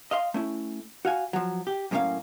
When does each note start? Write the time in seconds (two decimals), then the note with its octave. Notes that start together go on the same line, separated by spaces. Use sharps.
0.11 D#5 F5 C6
0.34 A3 C#4 E4
1.05 F#4 F5 G#5
1.33 F3 F#3
1.67 G4
1.91 F#2 A2 G3 A#3 C#4 F5